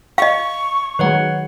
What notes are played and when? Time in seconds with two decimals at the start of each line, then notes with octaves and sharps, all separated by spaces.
0.18 D#5 F5 C#6
0.99 D#3 F#3 G#3 B4 C#5 F#5